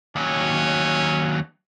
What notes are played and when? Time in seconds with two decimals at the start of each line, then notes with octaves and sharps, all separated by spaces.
0.16 D#2 F#3 C#4